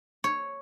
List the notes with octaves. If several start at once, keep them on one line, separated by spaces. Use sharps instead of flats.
C#5